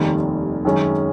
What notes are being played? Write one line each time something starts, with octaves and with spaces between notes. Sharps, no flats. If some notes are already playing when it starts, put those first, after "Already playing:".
Already playing: F1 D#2 D#3 G3
F#2 D#3 G#3 C#4